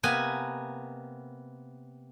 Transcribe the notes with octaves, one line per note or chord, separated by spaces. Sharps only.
C3 A#3 B3 G#5